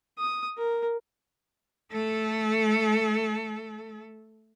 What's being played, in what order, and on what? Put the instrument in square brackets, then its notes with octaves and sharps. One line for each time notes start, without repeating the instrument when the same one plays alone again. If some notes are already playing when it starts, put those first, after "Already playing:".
[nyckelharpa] D#6
A#4
[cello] A3 A4